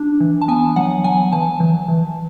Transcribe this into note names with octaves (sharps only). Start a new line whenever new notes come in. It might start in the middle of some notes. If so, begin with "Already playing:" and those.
Already playing: D4
E3
A5
B3 G#5
F#3 F#5
F#3 G#5
E3 A5
E3
E3